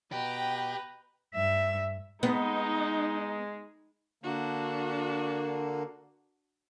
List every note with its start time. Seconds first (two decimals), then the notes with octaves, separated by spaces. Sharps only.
0.12 B2 G4 B4 G5 A#5
1.35 G2 E5
2.23 G#3 B3 D#4
4.23 D3 A#3 D4 F#4